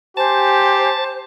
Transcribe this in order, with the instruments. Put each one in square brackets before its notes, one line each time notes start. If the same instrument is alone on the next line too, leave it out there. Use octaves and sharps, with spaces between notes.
[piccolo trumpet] G4 [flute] C5 [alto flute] G#5 [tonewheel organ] A5